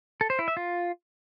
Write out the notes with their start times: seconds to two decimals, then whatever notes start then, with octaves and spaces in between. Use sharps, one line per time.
0.21 A4
0.30 C5
0.39 E4
0.48 E5
0.57 F4